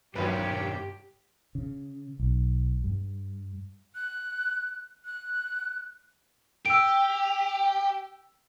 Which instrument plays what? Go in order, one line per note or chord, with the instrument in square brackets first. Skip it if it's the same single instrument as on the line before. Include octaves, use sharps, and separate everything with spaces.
[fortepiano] B1 B4 [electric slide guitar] G2 C#3 [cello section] G4 [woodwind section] A#4 C#5
[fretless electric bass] C#3
B1
G2
[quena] F#6
F#6
[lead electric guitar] G4 [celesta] E6 D7